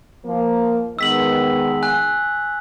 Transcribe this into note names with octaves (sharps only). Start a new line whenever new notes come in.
F3 A#3
D#3 G#3 B3 E6 B6 F#7
G#5 F#6